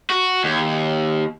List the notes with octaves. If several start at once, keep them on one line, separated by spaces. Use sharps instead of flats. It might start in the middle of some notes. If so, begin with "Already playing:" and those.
F#4
D#2